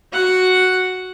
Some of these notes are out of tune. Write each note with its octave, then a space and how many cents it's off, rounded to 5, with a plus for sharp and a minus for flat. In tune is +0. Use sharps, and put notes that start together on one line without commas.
F#4 +0 F#5 +0